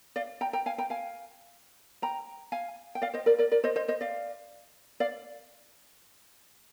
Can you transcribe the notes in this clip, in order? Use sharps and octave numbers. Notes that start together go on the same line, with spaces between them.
D5 F5
G5 A#5
G5 A#5
F5 G#5
G5 A#5
F5 G#5
G5 A#5
F5 G#5
G5
D5 F5
C5 D#5
A#4 D5
A#4 D5
A#4 D5
C5 D#5
C5 D#5
C5 D#5
D5 F5
D5 F5